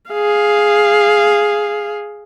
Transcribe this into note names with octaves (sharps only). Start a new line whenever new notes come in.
G#4 F5